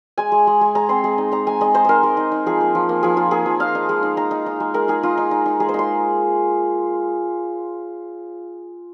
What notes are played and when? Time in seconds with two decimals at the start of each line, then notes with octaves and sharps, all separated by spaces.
0.18 G#3 G#5
0.32 G#3
0.47 G#3
0.61 G#3
0.75 G#3 A#5
0.89 C4 C6
1.04 G#3
1.18 D#4
1.32 D#4 A#5
1.47 G#3 G#5
1.61 G#3 D#5
1.74 D#4 C5
1.85 D#4 A#4 C5
2.03 G#3
2.17 D#4
2.32 D#4
2.46 F3 G#4
2.61 A#3
2.75 F3
2.89 A#3
3.03 F3 G#4
3.17 A#3 F4
3.31 A#3 G#4
3.46 F3
3.60 D#4 F5
3.75 D#4
3.89 G#3
4.03 D#4
4.17 D#4 A#5
4.31 D#4
4.46 D#4
4.60 G#3
4.74 G#3 A#4
4.88 D#4 G#4
5.03 D#4 F4
5.18 D#4
5.31 D#4
5.46 D#4
5.60 G#3 G#4
5.69 C5
5.74 D#4 C6